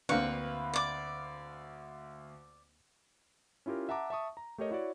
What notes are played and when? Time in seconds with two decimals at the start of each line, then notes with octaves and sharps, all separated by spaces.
0.09 D2 A#3 C4 D4 B4 F5 C#6
0.74 D5 D6
3.66 C#4 E4 F4 G4 A#4
3.89 E5 F#5 A5 A#5 D6
4.10 E5 A5 C#6 D#6
4.37 A#5
4.58 A3 G4 A#4 C#5 D#5
4.71 E4 F#4 C#5 D5